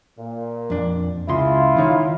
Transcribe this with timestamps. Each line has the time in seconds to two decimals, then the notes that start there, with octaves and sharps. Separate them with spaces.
0.19 A#2
0.70 F2 D4
1.28 C#2 C#3 E4 F4 C6
1.77 D#3 D#4 C#5